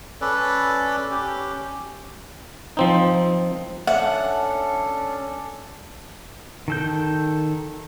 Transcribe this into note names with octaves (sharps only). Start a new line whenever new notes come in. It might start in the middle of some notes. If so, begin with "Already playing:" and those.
C#4 A4 B4 D5
C#4 G4
F3 C4 D#4
C#4 D4 A4 E5 F#5
D#3 A4 G6